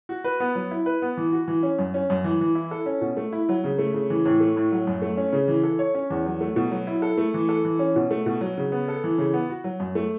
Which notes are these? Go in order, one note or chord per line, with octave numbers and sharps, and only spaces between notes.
F#4
B4
B3
F#3
E4
B4
B3
E3
F#4
E3
C#4
F#2
C#4
F#2
E3
E3
E4
A4
C#4
B2
A3
E4
F#3
C#3
A3
C#3
E3
A2
A3
A2
F#3
F#2
A3
C#4
C#3
E3
A4
C#5
C#4
E2
F#3
A3
B2
F#3
E4
A4
A3
E3
A4
E3
C#4
B2
A3
B2
F#3
C#3
B3
A4
E3
C#3
B3
F#4
F#3
F#2
A3